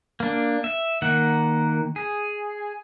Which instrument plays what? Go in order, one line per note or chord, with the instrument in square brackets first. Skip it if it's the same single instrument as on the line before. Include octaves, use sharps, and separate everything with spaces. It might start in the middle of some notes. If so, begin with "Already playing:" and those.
[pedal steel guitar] A#3 D4
E5
D#3 A#3 F#5
G#4